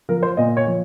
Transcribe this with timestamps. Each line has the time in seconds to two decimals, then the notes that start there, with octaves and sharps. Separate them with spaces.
0.09 F3 A#4
0.23 C5
0.37 A#2 D#5
0.57 C#5
0.67 F3